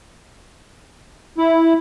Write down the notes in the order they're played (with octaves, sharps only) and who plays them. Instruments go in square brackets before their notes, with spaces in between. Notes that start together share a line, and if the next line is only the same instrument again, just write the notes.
[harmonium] E4